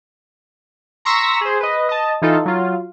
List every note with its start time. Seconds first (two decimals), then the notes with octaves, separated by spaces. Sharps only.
1.05 A#5 C6 C#6 E6 A#6 B6
1.41 G#4 C5
1.60 B4 D#5
1.89 D#5 A5
2.22 E3 D#4 F4 A4
2.45 F#3 F4